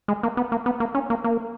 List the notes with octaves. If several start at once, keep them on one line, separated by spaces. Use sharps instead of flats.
G#3
A#3
B3
A#3
B3
A#3
C#4
A#3
A#3